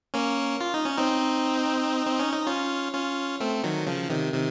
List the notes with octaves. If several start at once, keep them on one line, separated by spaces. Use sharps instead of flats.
A#3 C#4
F4
D#4
C#4
C4 D#4
C4
C#4
D#4
C#4 F4
C#4 F4
A3 C4
D#3 F#3
C#3 F3
C3 D#3
C3 D#3